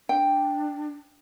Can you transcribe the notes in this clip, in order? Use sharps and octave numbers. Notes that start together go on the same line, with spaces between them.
D4 G5